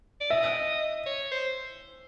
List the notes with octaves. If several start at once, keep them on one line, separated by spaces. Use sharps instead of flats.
D5
D#5 E5
C#5
C5